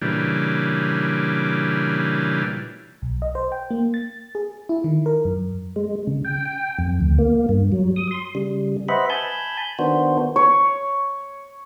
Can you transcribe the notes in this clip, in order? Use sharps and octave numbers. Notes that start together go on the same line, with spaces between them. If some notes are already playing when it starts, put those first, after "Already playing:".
A#2 C#3 E3 G3 D4
B1
D#5
C5
G5
A#3
A6
G#4
E4
D#3
A#4
F#2
G#3
C#3
G5
G5
F2
D2
A#3
G2
F#3
D#6
C6
C#3 G3
B4 C5 D#5 E5 F#5 B5
G#5 A5 B5 G6
D#3 B3 D4 F#4 C5
C#5